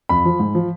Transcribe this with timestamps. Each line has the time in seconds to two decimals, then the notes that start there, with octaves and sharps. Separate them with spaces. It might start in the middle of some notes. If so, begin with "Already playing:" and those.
0.09 F2 B5
0.25 F3
0.40 G#2
0.55 F3